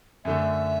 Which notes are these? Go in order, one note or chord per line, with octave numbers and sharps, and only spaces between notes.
F#2 D3 A3 E5